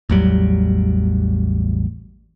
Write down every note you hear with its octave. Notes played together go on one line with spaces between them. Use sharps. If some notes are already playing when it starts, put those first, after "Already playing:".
A1 E2 F#3 G3